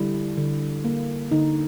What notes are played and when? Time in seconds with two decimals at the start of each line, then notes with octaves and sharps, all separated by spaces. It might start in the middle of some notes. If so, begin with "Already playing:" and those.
Already playing: D3 G3 E4
0.37 D3
0.85 A#3
1.31 D3 D#4